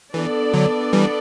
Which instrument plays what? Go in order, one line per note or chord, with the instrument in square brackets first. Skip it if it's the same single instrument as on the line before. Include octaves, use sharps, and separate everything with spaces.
[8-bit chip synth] E3 [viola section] B3 D4 A4 D5
[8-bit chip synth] D3 F#3
E3 G3